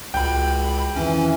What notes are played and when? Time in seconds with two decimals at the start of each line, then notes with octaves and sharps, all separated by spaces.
0.14 C#2 G#3 F#4 G5 B5
0.96 F2 D#3 E3 C#4